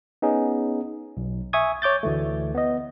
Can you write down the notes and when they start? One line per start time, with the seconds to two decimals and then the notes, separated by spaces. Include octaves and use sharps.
0.22 B3 C#4 D#4 G#4
1.17 B1
1.53 E5 G#5 C#6 D#6 G#6
1.82 C#5 D6 G6 A6
2.03 D2 E3 A3
2.55 B3 D#5